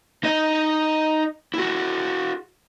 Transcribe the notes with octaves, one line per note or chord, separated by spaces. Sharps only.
D#4 D#5
E4 F#4